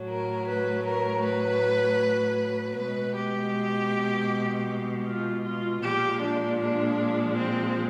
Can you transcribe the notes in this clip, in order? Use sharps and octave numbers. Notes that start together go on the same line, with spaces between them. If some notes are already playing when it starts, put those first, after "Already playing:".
Already playing: A2 F#3 A3
A#4
B4
A#4
B4
B2 G#3 B4
G4
F4
F4
A#2 F3 G#3 G4
D4
D4
C4